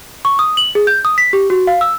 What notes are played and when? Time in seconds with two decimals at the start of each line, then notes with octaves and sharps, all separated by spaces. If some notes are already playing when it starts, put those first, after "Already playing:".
0.25 C#6
0.39 D#6
0.57 F#7
0.75 G#4
0.87 G6
1.05 D#6
1.18 B6
1.33 G4
1.50 F#4
1.67 F5
1.81 E6